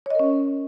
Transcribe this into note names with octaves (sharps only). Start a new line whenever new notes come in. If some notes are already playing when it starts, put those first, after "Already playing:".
C#4 A#4 C#5 D#5